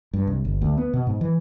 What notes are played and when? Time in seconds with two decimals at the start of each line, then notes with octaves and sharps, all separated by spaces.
0.13 G2
0.27 C2
0.45 G1
0.61 D2
0.77 B3
0.94 B2
1.07 G#2
1.21 E3